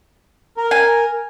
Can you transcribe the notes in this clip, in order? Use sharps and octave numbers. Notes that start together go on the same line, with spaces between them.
A#4
G#5